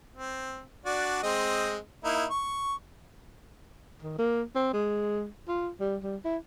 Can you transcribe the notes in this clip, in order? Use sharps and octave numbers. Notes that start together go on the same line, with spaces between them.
C4
D4 F#4 D5
G#3 C4 D#5
A#3 D#4 E4
C#6
D#3
A#3
C4
G#3
F4
G3
G3
E4